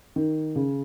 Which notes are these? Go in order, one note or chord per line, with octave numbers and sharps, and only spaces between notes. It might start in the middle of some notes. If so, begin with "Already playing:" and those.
D#3
C#3